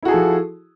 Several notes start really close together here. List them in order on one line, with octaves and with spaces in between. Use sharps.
E4 F#4 G#4 A4 F3